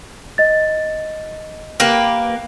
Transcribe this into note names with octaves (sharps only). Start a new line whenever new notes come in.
D#5 A6
A#3 G4 B4